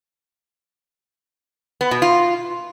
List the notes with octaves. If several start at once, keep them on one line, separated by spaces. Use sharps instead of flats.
B3
B2
F4